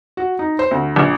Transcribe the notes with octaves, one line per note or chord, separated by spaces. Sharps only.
F#4
D#4
C5
D2
A#1